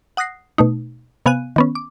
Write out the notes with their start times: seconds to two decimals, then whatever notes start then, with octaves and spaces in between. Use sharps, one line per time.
0.17 F#5 D#6 F#6 A#6 C7
0.58 B2 A3 D#4
1.26 C3 B3 F5 G#5 F#6 D#7
1.56 D#3 B3 C#4
1.75 D6